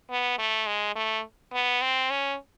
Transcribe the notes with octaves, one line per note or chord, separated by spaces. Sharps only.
B3
A3
G#3
A3
B3
C4
C#4